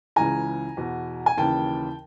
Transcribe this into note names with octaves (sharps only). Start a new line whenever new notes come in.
C#2 C#3 E3 G#5 A#5
E2 B2
G#5
D#2 C#3 E3 G5 A5